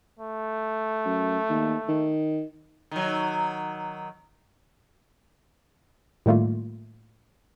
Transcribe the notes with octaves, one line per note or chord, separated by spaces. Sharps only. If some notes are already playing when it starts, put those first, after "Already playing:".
A3
F#2
D#2
D#3
D#3 F#3
A2 D#3 G3 A3 A#3 F4